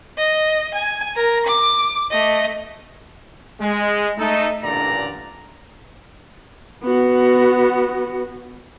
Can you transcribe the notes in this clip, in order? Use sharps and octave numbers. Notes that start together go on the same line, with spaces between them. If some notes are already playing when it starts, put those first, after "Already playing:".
D#5
G#5
A#4 A#5
D6
A3 D#5
G#3
A3 D#4 A4
A1 G2 A#2 D3 D5 A#5
B3 F#4